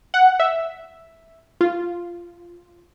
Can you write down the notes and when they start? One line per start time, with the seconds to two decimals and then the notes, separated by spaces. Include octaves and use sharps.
0.14 F#5
0.40 E5
1.61 F4